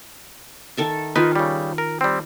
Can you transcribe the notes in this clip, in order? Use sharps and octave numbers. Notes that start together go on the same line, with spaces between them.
D#3 A4 E5
D#3 D#4 F4 B4
C#3 G3
A#4
G3 C4